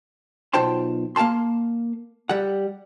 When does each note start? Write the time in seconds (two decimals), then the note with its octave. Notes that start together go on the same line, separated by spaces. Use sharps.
0.53 B1 F4 C5 G5 A5 C6
1.16 A#3 F5 G5 A5 C6
2.29 G3 F#5